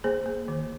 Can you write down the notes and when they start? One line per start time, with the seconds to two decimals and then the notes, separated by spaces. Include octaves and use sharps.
0.04 A#3 G#4 C5
0.26 A#3
0.48 D#3